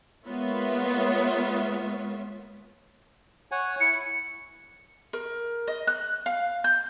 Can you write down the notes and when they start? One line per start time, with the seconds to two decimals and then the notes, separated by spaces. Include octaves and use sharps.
0.25 G#3 A#3 B3 F4 C#5 E5
3.52 C#5 F#5 G#5
3.81 E4 C#7
5.13 A#4
5.68 D#5
5.87 F#6
6.26 F5
6.64 G6